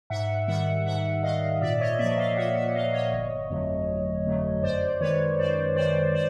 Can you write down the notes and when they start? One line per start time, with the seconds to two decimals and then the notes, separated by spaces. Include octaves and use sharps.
0.10 G#2 E5 F#5
0.48 D#3 G3 E5 F#5
0.86 G#2 E5 F#5
1.23 D#3 G3 D#5 F5
1.61 A#2 D5 E5
1.80 C#5 D#5
1.99 F3 A#3 D5 E5
2.18 D#5 F5
2.37 A#2 E5 F#5
2.56 E5 F#5
2.74 F3 A#3 D#5 F5
2.93 C#5 D#5
3.12 G1
3.50 F2 D3 F#3 A3
3.88 G1
4.25 F2 D3 F#3 A3
4.63 F#2 C5 D5
5.01 D#3 G#3 B4 C#5
5.38 F#2 C5 D5
5.76 D#3 G#3 C5 D5
6.14 C5 D5